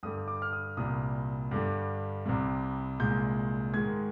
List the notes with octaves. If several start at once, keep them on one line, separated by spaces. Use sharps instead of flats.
G2 D3 G3 D#6
D#6
D6
F6
D#6
C2 A#2 G3 D#6
G2 D3 G3
C2 C3 G3
C2 A#2 G#3 G6
G#2 D#3 G#3 G#6